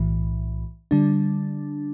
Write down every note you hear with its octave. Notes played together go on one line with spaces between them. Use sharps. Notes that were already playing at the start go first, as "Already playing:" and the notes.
Already playing: B1 A2 E3
D3 G3 D4